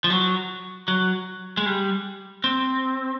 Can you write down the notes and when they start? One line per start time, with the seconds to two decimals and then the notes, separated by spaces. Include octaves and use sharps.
0.04 F3
0.10 F#3
0.88 F#3
1.57 G#3
1.66 G3
2.44 C4